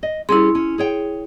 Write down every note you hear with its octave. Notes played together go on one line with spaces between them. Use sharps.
D#5
G3 C#4 E4 G#4 C6
C#4
G#4 C#5 G5